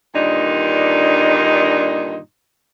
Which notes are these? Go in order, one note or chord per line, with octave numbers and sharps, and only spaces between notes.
G2 A#2 D3 D#3 D4 D#4